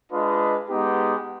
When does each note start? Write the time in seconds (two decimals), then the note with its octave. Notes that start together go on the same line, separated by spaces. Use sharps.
0.11 G#3 D4 F4 B4 D#5
0.69 G#3 B3 D#4 G4